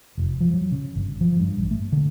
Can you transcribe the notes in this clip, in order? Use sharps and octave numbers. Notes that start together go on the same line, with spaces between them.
F1
F3
F#3
C#3
G1
F3
G2
A1
A3
D3